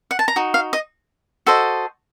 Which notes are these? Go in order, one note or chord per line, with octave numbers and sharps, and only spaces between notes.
F#5
A5
A#5
D#4 F#4
F5
D#5
F#4 A4 C5 D#5